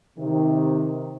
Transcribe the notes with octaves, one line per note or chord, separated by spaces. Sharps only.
C3 D#3